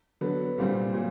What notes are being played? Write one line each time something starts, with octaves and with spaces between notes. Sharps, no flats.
D3 F#3 B3
C2 A#2 G3 C4
A#2 F#3